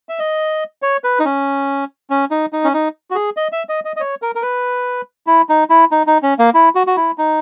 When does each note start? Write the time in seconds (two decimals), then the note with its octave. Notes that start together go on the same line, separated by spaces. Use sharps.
0.09 E5
0.19 D#5
0.82 C#5
1.04 B4
1.20 D#4
1.25 C#4
2.10 C#4
2.31 D#4
2.53 D#4
2.64 C#4
2.74 D#4
3.11 F#4
3.15 G#4
3.37 D#5
3.52 E5
3.69 D#5
3.85 D#5
3.96 D#5
4.00 C#5
4.22 A#4
4.35 A#4
4.42 B4
5.27 E4
5.49 D#4
5.70 E4
5.91 D#4
6.07 D#4
6.23 C#4
6.39 A#3
6.54 E4
6.75 F#4
6.87 F#4
6.97 E4
7.18 D#4